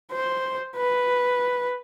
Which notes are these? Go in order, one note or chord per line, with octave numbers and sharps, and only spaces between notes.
C5
B4